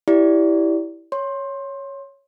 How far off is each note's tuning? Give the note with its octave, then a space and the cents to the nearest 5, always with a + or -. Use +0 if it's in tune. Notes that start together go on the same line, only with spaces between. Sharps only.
E4 +0 G4 +0 D5 -15
C#5 +0 C6 +20